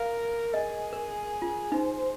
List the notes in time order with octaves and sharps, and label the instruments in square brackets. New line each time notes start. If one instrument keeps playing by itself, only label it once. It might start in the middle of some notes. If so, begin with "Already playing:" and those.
Already playing: [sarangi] A#4 [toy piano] F5
[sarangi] G#4 [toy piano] D#5
[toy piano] A#4
F4
[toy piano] D#4 [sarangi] C5